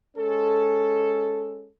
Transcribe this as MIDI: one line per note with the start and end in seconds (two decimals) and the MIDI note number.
0.17 1.70 56
0.17 1.70 61
0.17 1.70 69